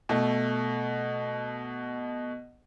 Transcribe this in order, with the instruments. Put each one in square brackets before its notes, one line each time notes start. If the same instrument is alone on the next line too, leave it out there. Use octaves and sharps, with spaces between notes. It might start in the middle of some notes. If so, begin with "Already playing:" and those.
[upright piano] B2 A3